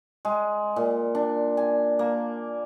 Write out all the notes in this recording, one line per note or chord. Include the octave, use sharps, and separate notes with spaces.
G#3
A#2
D4
G#5
A#3